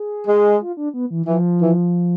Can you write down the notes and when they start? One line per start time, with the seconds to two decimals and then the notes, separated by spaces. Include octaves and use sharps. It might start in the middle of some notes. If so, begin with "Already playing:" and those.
Already playing: G#4
0.27 G#3
0.60 F4
0.77 D4
0.94 B3
1.11 E3
1.26 E3 F3
1.61 E3